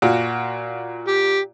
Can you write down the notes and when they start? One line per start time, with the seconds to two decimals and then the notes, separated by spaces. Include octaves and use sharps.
0.02 A#2 F4 F#4
1.08 G4